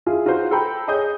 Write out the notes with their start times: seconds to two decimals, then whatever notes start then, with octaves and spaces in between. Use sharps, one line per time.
0.06 E4 F4 G#4
0.25 D#4 F4 F#4 G#4 C5
0.51 A4 C5 G5 A#5 B5 G6
0.88 G#4 C#5 D#5 D#6 G6